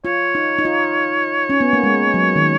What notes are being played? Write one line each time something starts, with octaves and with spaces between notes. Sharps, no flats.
F4 C#5
D#4
D#4
F4
C#4
B3
A#3
G#3
F#3
D#3